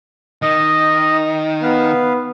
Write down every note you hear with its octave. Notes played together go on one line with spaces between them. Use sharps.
D#3 D#5
B3 B4 F5